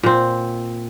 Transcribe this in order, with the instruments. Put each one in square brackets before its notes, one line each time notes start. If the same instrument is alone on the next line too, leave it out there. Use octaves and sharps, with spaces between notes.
[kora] A#2 C4